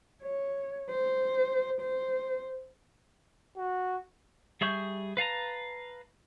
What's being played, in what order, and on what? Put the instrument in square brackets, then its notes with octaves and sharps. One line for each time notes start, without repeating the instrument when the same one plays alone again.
[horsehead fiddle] C#5
C5
C5
[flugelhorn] F#4
[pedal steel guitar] G3 G#4 E5 C#6 G6
B4 F5 A5 A#5